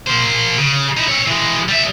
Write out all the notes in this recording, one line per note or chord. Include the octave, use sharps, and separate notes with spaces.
A#3 C5
C#3
D#4 E4
C4 C#5
E3 G#3
G3 E5